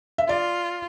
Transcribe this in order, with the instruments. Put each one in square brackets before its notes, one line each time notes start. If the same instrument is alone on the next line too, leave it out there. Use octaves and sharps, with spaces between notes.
[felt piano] E5
[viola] F4 [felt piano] D5